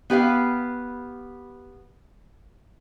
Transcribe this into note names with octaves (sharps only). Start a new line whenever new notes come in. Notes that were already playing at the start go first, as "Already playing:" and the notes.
B3 G4 B4 F5